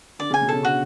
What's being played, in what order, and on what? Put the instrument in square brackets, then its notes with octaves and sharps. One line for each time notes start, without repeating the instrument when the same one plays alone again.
[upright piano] D3 [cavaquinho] D5
[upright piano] C#3
[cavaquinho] G#5
[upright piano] B2
[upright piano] C#3 [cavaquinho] A4
[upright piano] D3 [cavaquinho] F#4